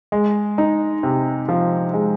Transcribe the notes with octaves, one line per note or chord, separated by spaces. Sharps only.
G#3
D#4
C3
F3
G#3